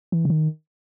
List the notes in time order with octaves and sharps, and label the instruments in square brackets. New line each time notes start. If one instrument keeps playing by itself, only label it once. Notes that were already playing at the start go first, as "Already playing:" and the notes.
[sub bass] E3
C#3
D#3